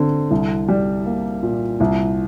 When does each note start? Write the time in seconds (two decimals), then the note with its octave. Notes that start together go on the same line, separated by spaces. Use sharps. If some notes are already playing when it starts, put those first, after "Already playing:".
Already playing: D3 C4
0.31 C2
0.68 G3
1.06 A#3
1.43 A#2
1.80 C2